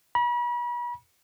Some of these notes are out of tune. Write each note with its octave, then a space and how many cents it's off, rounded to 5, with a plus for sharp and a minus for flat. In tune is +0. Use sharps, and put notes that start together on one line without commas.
B5 -40